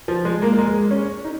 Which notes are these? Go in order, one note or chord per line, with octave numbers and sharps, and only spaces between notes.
F3
G#3
A#3
A#3
G#3
C#4
D#4